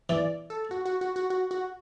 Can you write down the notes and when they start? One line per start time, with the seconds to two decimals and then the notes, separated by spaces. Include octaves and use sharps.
0.09 E3 D5
0.50 A4
0.71 F#4
0.85 F#4
1.01 F#4
1.16 F#4
1.30 F#4
1.51 F#4